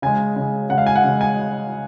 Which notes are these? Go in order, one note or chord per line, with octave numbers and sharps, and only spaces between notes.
C#3 G#3 G#5
C#3 G#3
C#3 G#3 F#5
F5
G#5
F#5
C#3 G#3
G#5